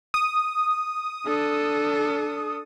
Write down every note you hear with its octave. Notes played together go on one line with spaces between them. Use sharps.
D#6
D4 A4